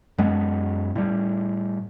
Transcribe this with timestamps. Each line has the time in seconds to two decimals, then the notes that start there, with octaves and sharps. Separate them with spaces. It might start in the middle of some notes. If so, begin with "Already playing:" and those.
0.18 F#2 G#3 B3
0.96 A2 G3